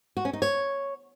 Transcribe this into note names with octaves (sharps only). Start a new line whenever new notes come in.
F#4
C#4
D#4
C#5